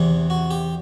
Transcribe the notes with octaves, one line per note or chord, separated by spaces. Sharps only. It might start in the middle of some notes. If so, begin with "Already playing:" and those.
Already playing: E2 C3 E3
F#4
G4